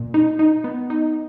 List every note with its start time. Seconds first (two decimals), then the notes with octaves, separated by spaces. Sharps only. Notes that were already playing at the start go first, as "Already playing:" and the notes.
Already playing: A#2
0.14 D#4
0.39 D#4
0.64 B3
0.90 D#4